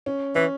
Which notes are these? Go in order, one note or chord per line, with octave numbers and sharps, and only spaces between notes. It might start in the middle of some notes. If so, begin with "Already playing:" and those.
C#4
E3 C#4